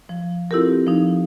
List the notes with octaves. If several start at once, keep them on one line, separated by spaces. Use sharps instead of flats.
F3
C4 E4 F4 G4 A4 A#4
F3 D#4